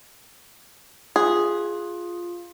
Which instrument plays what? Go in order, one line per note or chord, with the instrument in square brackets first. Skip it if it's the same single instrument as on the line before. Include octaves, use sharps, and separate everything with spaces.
[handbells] F4 [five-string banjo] G#4